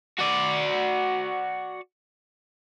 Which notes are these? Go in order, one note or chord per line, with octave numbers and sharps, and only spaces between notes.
F#4 D5